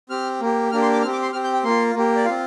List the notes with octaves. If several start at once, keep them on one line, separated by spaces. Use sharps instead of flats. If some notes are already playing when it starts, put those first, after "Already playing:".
C4 G4 F6
A#3 G4
A#3 D4 G4 F6
C6
D6
C4 G4 F6
D6
C6
C4 G4 F6
G6
G5
A#3 F4 C6
A#3 G4
D5
C4 F4 F5